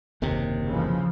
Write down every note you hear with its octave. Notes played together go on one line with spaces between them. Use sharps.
F#1 D#2 C3
C#3 E3 F3